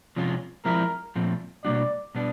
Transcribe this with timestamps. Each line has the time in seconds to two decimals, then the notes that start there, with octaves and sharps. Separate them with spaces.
0.16 C3 F3 G#3 C#4 F4
0.65 F3 G#3 C4 E4 G4 A#4
1.16 A#2 F3 A3 C4
1.64 B2 G3 A#3 D4 F#4 D5
2.15 B2 G3 B3 D4